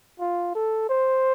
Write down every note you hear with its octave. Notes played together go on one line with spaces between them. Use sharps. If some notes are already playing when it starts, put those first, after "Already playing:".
F4
A4
C5